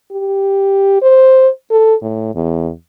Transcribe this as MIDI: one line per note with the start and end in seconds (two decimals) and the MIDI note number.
0.12 0.98 67
1.02 1.48 72
1.71 1.94 69
2.02 2.35 45
2.35 2.70 40